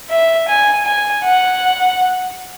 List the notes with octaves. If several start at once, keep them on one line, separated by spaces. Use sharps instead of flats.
E5
G#5
G#5
F#5